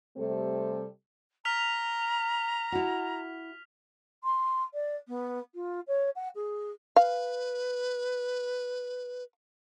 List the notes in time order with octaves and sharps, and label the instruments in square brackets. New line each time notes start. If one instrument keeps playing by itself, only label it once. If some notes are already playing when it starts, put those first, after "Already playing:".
[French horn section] C3 G3 A3 C4 A4
[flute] A#5 [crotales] F6 B6 F7
[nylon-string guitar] E4 F#4
[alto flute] C6
D5
B3
F4
C#5
F#5
G#4
[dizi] B4 [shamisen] F5